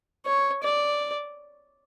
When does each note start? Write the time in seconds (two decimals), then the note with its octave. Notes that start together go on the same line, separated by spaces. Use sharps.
0.26 C#5
0.63 D5